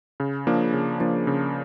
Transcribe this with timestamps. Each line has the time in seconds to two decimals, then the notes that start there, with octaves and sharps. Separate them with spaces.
0.20 C#3
0.47 F3 A#3 D4
0.73 C#3
1.00 F3 A#3 D4
1.27 C#3